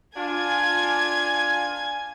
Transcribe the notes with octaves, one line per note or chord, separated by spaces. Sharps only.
D4 F4 G#5 G#6